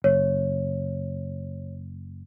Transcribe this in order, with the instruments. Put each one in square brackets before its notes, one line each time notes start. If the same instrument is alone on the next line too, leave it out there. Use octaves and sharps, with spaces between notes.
[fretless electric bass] F#1 [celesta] C#5